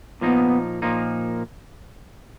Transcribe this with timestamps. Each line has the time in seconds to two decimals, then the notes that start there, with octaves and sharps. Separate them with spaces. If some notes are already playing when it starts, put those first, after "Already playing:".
0.21 A#2 F3 A#3 B3 D#4
0.82 A#2 F3 A#3 D#4